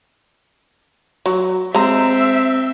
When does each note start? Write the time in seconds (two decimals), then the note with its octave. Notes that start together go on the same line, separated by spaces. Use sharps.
1.26 F#3
1.75 G#3 C4 E5 A#5